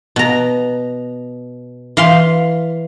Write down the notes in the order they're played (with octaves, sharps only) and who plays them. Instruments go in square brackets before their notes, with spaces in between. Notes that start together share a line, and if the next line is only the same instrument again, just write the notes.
[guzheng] B2 A#5
E3 F5 C6